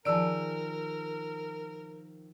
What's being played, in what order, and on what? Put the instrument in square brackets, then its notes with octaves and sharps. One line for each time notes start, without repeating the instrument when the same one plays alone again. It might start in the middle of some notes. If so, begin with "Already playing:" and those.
[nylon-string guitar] D#3 F3 G#4 [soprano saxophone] A#4 [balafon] D5 A5 [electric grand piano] E6 D7